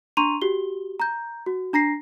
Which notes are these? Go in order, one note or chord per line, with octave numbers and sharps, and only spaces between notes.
D4 A#5 C6 C#6 D#7 F7
F#4 G4 G7
A#5 G6
F#4
D4 A#5 A#6 C7